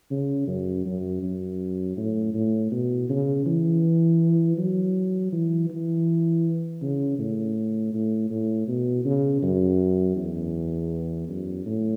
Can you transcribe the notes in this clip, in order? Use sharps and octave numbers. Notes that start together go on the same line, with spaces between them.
C#3
F#2
F#2
F#2
A2
A2
B2
C#3
E3
F#3
E3
E3
C#3
A2
A2
A2
B2
C#3
F#2
E2
F#2
A2